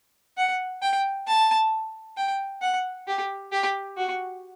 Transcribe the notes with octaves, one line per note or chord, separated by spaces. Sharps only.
F#5
G5
A5
G5
F#5
G4
G4
F#4